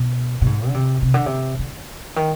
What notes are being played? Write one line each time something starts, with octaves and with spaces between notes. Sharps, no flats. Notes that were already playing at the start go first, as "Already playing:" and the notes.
Already playing: B2
B2
G#2
D3
C3
C3
D3
C3
D3
D#3